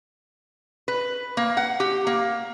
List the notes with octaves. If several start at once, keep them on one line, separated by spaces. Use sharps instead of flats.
B4
A#3
F#5
G4
A#3